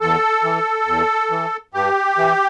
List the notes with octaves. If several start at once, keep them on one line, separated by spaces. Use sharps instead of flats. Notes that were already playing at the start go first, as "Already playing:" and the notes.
E2 A4
E3
E2
E3
G2 G4
E3